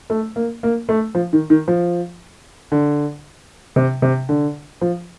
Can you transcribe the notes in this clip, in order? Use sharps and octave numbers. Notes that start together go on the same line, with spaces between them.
A3
A#3
A#3
A3
F3
D#3
D#3
F3
D3
C3
C3
D3
F3